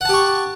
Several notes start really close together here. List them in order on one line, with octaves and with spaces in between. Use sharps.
F#5 A5 G4 C#6